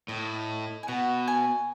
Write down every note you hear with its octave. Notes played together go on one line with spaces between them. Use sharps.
A2 D#5
G#5
B2 F#5
G#5